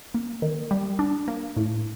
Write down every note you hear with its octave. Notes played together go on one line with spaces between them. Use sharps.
A#3
D#3
G3
D4
A#3
A2